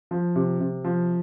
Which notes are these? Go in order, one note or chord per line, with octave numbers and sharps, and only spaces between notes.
F3
C3
C3
F3